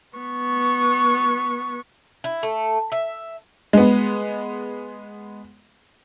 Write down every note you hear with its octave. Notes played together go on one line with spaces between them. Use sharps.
B3 C#6
E4
A3
E5
G#3 B3